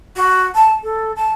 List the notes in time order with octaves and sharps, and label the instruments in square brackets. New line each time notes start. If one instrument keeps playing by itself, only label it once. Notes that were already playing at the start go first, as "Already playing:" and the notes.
[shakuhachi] F#4
A5
A4
A5